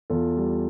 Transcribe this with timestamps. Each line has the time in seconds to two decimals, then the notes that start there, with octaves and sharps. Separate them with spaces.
0.10 E2 F4 A4
0.37 G3